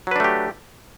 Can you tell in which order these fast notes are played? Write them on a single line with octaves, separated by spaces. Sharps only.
F#3 B4 D4 A3 G4